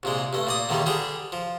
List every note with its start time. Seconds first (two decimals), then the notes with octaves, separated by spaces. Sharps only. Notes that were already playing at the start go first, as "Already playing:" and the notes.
0.03 C2 A#2 G#3
0.33 G2 A3
0.47 A#2 D5 D#6
0.69 E2 A#2 D3 D#3 G3
0.86 D3 G3 D4 G#4
1.32 F3